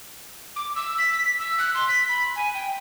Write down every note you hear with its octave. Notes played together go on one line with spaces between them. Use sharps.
D6
E6
B6
E6
F#6
C6
B6
B5
G#5
G5